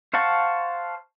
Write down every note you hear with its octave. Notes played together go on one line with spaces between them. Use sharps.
C5 F5 F#5 A5 C#6